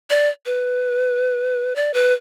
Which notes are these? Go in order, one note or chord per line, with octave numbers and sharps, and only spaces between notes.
D5
B4
D5
B4